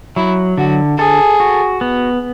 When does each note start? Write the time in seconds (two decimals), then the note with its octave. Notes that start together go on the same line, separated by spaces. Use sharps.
0.16 F#3 E4
0.58 D3 F#4
0.98 G#4 A4
1.40 F#4
1.81 B3